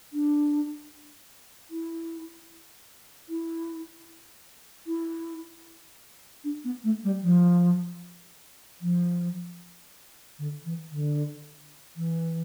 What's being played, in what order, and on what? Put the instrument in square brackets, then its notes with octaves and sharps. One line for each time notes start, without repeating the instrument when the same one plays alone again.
[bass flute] D4
E4
E4
E4
D4
B3
A3
G3
F3
F3
D3
E3
D3
E3